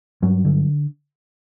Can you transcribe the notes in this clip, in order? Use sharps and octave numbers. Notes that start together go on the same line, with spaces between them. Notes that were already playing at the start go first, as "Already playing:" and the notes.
G2 F#3
D3